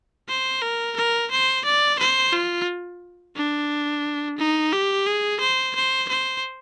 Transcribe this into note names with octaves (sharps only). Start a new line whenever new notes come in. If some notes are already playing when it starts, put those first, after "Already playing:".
C5
A#4
A#4
C5
D5
C5
F4
D4
D#4
G4
G#4
C5
C5
C5